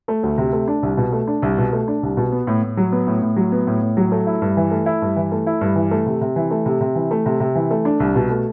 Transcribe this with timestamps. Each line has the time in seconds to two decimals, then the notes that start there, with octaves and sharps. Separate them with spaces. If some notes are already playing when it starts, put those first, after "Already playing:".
0.08 A3
0.23 D2
0.38 C3
0.53 A3
0.68 D4
0.83 C2
0.97 B2
1.12 A3
1.27 D4
1.42 C2
1.58 B2
1.73 A3
1.88 D4
2.03 C2
2.17 B2
2.32 B3
2.47 A2
2.63 A2
2.77 F#3
2.92 B3
3.07 A2
3.22 A2
3.36 F#3
3.52 B3
3.67 A2
3.82 A2
3.97 F#3
4.12 A3
4.27 E4
4.42 G2
4.57 E3
4.71 A3
4.86 E4
5.02 G2
5.16 E3
5.32 A3
5.47 E4
5.61 G2
5.76 E3
5.91 A3
6.06 C3
6.21 C3
6.36 E3
6.51 A3
6.66 C3
6.81 C3
6.95 E3
7.11 A3
7.26 C3
7.40 C3
7.55 E3
7.71 A3
7.85 D4
8.00 C2
8.15 B2
8.30 A3